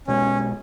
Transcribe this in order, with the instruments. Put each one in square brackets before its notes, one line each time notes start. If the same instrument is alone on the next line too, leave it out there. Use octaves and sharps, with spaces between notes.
[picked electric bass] B1 B2 G#3 [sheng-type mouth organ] C#4